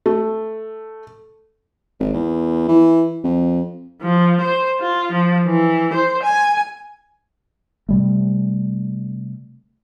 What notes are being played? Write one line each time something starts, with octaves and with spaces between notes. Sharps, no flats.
A3
G#1
E2
E3
F2
F3
C5
F4
F3
E3
C5
G#5
C3 G3 A3